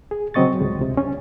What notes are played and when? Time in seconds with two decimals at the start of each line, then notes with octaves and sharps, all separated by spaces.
0.11 G#4
0.34 C#3 F#3 C4 D#5 C#6 A6
0.61 C#2 G#3
0.78 C#2 C3
0.97 C#4